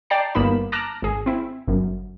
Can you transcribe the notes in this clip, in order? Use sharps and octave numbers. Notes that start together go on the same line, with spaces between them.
D5 G5 A5 A#5 C7
G1 A#3 B3 D#4 B5 E7
A5 A#5 D6 F6 F#6 A#6
G#1 G#4
C4 E4
G1 F#2